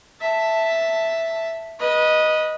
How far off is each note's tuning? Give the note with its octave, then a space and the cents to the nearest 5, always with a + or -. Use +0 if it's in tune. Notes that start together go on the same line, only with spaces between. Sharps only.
E5 +0 A5 +0
B4 -25 D#5 +0